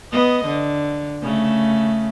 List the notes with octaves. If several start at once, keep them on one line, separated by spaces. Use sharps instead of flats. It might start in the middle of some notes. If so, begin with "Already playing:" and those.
B3 D#5
D3
C#3 A3